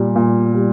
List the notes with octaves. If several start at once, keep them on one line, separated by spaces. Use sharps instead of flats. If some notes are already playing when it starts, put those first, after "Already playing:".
Already playing: A#2 G3
A#2
G3